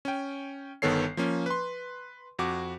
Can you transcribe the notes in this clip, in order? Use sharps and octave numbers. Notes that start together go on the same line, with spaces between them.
C#4 G5
G1 D#3 B3 A4 C#5 C7
F3 A#3 C#4
B4 C6
F2 F#4 D6